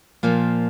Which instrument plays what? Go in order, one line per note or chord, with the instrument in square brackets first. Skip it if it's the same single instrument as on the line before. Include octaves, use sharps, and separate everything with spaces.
[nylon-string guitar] A#2 F3 A#3